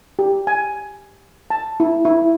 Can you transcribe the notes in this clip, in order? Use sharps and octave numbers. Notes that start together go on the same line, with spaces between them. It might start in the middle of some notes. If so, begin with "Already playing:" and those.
G4
G#5
A5
E4
E4